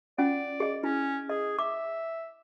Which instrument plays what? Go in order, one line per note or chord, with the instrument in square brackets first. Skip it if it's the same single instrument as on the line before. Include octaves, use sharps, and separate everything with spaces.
[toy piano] C#4 F4 F#5 [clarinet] D5
[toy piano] G#4 D#5
[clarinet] C#4 [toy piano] E4
[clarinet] G#4 [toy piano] D#5
[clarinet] E5 [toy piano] D6